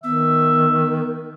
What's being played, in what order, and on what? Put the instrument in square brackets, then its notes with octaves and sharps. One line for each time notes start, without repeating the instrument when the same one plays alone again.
[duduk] D#3 [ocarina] B3 [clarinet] E5